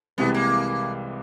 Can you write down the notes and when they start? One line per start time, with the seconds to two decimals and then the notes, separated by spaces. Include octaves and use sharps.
0.18 C2 C3 E3 G#3 B3
0.34 A#3